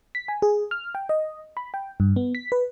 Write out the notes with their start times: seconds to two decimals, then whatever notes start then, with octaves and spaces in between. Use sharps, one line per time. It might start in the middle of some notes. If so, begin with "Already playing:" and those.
0.15 B6
0.28 G#5
0.42 G#4
0.71 F6
0.95 G5
1.09 D#5
1.57 B5
1.74 G5
2.00 G2
2.16 B3
2.35 B6
2.52 B4